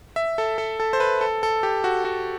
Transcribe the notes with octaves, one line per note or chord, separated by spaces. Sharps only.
E5
A4
A4
A4
C5
B4
A4
A4
G4
F#4
F#4